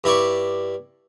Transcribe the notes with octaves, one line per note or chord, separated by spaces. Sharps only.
G2 E4 D5 C#6